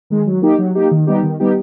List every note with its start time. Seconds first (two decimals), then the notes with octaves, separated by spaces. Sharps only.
0.10 D#3 G#3
0.26 F#3
0.42 A#3 D#4 G4
0.58 F#3
0.75 A#3 D#4 G4
0.91 D#3
1.07 G3 B3 D#4 G4
1.23 D#3
1.40 G3 B3 D#4 G4